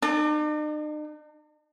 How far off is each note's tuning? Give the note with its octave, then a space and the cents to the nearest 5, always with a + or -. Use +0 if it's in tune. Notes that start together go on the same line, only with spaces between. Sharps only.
D#4 -45 A5 +0 D6 +25